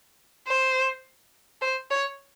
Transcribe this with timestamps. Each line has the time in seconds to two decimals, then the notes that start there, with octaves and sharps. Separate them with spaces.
0.48 C5
1.61 C5
1.90 C#5